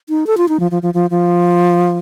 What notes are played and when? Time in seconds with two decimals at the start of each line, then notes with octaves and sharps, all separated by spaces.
0.09 D#4
0.27 A4
0.37 F4
0.49 D#4
0.60 F3
0.71 F3
0.82 F3
0.94 F3
1.10 F3